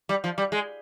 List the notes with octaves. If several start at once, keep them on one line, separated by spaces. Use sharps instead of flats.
G3
F3
G3
G#3